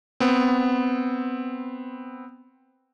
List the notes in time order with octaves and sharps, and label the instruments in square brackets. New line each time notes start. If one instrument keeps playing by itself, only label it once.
[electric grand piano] B3 C4